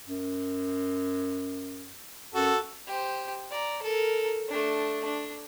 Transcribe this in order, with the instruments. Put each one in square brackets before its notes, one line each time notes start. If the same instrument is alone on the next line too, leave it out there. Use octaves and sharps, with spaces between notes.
[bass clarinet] F#2
[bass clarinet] F#2 [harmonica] F#4 A4
[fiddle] G4 C5
D5 A#5
A4 A#4
A3 D4
D4